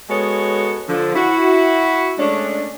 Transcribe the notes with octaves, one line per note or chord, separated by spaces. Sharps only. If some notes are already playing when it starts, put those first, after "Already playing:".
G#3 B3 F#4 A4 C#5
D3 F3
E4 F#4
G#3 A3 C#4 D4